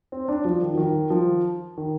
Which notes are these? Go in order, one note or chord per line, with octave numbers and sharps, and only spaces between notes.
C4
D4
F3
D#3
F3
D#3
F3
D#3